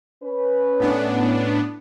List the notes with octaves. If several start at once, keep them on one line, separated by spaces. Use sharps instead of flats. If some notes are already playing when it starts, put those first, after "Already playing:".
C#4 B4
A2 B3 D4